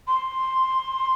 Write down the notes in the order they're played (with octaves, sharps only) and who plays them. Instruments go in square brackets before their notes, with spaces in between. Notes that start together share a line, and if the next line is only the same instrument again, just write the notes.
[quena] C6